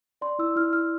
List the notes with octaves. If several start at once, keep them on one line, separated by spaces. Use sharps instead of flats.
D5 C6
E4 E6
E4 F6
E4 F6